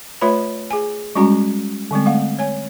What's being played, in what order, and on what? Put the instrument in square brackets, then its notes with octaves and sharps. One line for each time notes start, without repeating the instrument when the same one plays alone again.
[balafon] A3 F4 B4 C#5 E5 B5
G#4 G#5
G3 G#3 C#4 F#4 A#5
D3 G3 G#3 C4
A3 F5 F#5
C#5 G#5